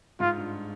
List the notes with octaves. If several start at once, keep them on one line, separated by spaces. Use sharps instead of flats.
G#2 F4
G2